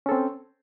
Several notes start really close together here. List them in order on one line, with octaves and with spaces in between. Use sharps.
C#4 A4 C4